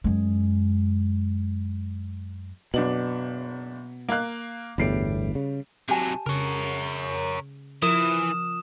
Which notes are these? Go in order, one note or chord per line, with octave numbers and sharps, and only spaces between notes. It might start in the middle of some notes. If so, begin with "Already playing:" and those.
F#2 G#3
F#1 B2 D4 F#7
A#3 F5 F#6
G1 E2 A2 G3 C7 D7
C#3
C3 F#3 G4 G#5 A5
C#3 A#4 C#5
E3 F3 A#4 D#6 E7